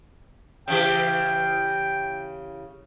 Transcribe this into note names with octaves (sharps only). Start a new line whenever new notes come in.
C#3 E3 G4 G5